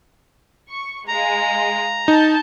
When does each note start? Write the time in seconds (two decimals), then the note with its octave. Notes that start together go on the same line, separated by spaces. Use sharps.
0.70 C#6
1.08 G#3 F5 A#5
2.08 D#4 A5 G6